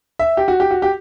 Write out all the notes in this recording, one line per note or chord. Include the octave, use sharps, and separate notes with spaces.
E5
G4
F#4
G4
F#4
G4